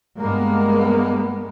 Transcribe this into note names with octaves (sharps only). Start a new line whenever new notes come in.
G2 G#3 A#3 B3